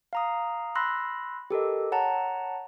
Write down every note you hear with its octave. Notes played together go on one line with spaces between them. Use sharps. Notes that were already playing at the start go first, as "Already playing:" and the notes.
F5 A#5 D#6
B5 C6 E6 F#6 A#6
G4 A4 A#4 D#5
C#5 F#5 A5 A#5